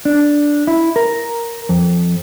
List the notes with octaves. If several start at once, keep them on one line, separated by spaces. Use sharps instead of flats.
D4
E4
A#4
F2